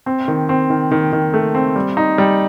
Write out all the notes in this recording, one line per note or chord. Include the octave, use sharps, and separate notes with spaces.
C4
D#3
C4
D#3
D#3
D#3
A3
C4
G3
D#4
G3